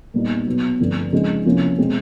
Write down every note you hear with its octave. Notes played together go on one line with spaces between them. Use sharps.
A#2 G3 B3 D#4
B2 F#3 B3
G2 D3 F3 A3 C4
C#3 F3 G#3 C4 D#4
C3 F3 A#3 C#4 E4
B2 G#3 C4